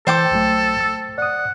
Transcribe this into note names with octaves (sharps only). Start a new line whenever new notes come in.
E3 A4 C5 G5 D6
B1 F#3 A3
E6
D5 F#5 D#6